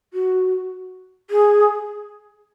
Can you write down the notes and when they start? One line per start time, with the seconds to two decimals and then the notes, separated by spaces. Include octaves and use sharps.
0.14 F#4
1.30 G#4